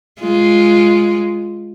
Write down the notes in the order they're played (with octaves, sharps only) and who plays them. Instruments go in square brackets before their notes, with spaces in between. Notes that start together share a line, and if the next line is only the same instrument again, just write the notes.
[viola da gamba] G#3 F4